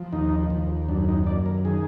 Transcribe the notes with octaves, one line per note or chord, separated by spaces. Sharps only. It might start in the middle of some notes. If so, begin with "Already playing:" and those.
Already playing: F3
D#2 D#4
D#2
F#2 D4
D#4
F#2 D5
A#4
D#3 G#4